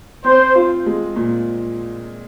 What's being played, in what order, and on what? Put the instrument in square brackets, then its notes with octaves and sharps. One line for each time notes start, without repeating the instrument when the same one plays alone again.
[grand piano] C4 [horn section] C5
[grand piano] F4
G#3
A#2